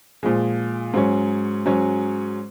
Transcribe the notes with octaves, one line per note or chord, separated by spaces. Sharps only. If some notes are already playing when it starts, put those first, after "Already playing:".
A#2 F3 G#3
G#2 F#3 C#4
G#2 F#3 C#4